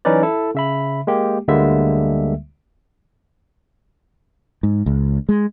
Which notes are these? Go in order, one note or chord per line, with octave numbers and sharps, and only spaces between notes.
E3 F#3 C#4 D#4 B4 D5
E4 A4
C#3 E5 B5
G#3 A#3 G4
D2 D3 G3 G#3 A#3 E5
G#2
C#2
G#3